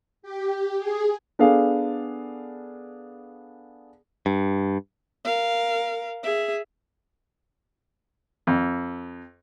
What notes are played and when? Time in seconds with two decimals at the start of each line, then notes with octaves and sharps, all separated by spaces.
0.22 G4
0.78 G#4
1.39 B3 D4 G#4 A4 F5
4.26 G2
5.25 A#4 F5
6.24 G#4 E5
8.47 F2